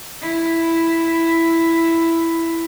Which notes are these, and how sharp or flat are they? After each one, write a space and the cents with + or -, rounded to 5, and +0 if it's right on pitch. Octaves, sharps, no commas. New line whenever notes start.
E4 +5